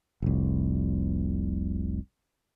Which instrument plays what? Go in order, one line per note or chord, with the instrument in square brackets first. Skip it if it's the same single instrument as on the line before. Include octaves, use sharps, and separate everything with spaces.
[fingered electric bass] F1 C2